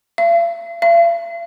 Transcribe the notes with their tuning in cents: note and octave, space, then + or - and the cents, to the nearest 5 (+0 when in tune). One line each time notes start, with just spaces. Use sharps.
F5 -45
F5 -45